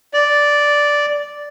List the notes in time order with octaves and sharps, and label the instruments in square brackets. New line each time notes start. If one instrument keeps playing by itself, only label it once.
[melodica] D5